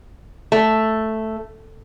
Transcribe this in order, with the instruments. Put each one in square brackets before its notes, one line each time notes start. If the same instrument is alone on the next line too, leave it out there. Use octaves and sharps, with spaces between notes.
[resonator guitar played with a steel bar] A3